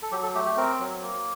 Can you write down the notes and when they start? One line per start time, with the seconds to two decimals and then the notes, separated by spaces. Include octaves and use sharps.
0.03 A4
0.12 F#3 G4
0.23 A4
0.35 A3 G4
0.45 G4
0.57 C4 A#4
0.80 F#3
1.03 A#3